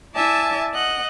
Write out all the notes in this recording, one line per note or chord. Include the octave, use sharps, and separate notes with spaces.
E4 D5 E5 G#5 A5
D#5 F#5 F#6